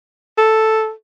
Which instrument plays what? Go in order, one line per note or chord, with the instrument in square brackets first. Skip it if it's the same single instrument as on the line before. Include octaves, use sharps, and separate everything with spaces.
[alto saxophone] A4